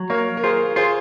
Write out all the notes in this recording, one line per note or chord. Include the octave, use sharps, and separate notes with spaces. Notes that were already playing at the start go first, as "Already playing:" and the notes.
Already playing: F#3
A#3 A#4 C#5
A#4
F4 G#4 C5
F4 G#4 C5